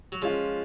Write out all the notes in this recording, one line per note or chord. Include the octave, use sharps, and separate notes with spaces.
F#3
F3 G#3 C#4 F4